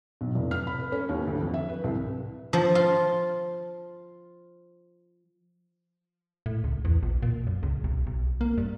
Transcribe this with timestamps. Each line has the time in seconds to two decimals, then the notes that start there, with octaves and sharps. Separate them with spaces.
0.21 B1
0.35 F1
0.51 F6
0.67 B5
0.80 B4
0.92 C#4
1.09 D#2
1.28 D2
1.40 F2
1.54 E5
1.69 B4
1.84 C2
2.53 F3
2.75 F4
6.46 A2
6.64 C#2
6.85 E2
7.03 A#1
7.23 A#2
7.47 F#2
7.63 C#2
7.84 B1
8.07 B1
8.41 A#3
8.58 G2